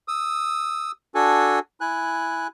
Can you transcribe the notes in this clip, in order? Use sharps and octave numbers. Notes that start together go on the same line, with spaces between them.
D#6 E6
D4 F#4 A4 G#5
E4 G#5 F#6